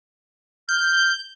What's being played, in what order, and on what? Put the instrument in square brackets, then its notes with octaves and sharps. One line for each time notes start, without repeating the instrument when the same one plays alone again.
[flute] F6 [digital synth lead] G6